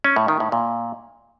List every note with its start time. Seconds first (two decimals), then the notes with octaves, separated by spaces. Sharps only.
0.04 C#4
0.16 A2
0.28 D#3
0.40 A2
0.52 A#2